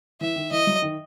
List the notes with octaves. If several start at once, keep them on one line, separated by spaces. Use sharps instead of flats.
E3 E5
D#3
E3 D#5
F#3
D#3